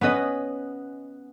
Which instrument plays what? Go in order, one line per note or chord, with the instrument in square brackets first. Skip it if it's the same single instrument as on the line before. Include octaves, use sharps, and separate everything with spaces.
[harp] B3 C#4 B4 D#5